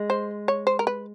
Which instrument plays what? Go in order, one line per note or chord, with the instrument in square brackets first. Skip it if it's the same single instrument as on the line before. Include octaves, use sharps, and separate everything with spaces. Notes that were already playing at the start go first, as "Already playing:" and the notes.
Already playing: [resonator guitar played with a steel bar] G#3
[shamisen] C5
C#5
C5
A#4
B4